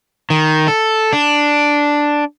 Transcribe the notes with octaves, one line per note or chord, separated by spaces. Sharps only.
D#3
A4
D4